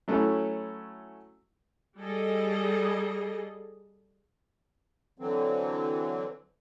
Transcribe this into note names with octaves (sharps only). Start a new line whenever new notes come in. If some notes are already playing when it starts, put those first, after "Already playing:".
F#3 A3 C#4 E4 F#4
G3 G#4 A4 D#5
D3 E3 F#3 C4